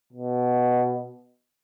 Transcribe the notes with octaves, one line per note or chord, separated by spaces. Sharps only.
B2